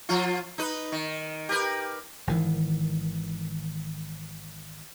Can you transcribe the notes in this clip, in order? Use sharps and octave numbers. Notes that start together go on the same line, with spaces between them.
F3 F4
D#4 B4
D#3
G4 A#4 B4
G#1 D#3 E3